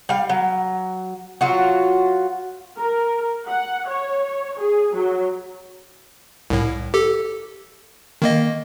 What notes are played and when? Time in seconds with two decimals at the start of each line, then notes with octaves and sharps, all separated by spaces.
0.09 G3 F5
0.29 F#3
1.41 F#3 F4 F#4
2.79 A#4
3.47 F#5
3.88 C#5
4.58 G#4
4.94 F#3
6.50 C2 A2
6.94 G4 A4
8.22 D#3 A#3 D#5